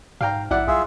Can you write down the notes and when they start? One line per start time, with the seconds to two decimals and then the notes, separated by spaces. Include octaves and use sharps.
0.21 G#2 F5 G5 A#5
0.51 A#1 E4 D5 F#5
0.68 B1 F4 G#4 E5